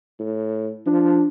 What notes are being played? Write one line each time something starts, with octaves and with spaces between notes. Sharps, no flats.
A2
F3 D4